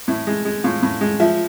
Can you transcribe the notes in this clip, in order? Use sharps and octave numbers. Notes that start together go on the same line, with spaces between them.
A2 E4
G#3
G#3
A2 F4
A2
G#3
F3 E5